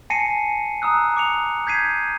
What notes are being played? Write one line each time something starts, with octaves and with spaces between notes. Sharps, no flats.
G#5 A5 A#6 C7 C#7 D#7
A#5 D#6 E6 F#6
D6 C#7 F7
G6 G#6 B6 C7 D#7